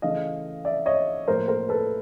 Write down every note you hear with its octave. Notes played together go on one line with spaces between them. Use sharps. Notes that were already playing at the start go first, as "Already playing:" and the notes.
C#3 E3 A3 D#5 F5
D5 E5
C#5 D#5
A2 F3 A#3 A#4 C5
A#4 C5
A4 B4